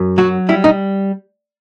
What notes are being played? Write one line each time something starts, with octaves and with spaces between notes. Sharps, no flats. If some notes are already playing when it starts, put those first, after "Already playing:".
Already playing: F#2
F#3 F#4
G3 E4
D#4